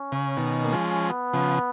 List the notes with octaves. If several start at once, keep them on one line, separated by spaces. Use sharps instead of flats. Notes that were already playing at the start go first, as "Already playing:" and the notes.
Already playing: C#4
C#3
B2 D#3
A#3
F3 G#3
B3
C#3 F3